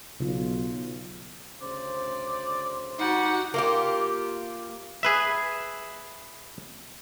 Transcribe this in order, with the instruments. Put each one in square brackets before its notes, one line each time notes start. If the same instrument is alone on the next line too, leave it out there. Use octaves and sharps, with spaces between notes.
[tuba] B1 [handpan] C#3 F4
[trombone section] D2 C#3 C5 [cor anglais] D5
[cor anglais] G3 [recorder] D#4 [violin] F#4 F#5
[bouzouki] A#3 F4 G4
[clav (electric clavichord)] G#4 B4 E5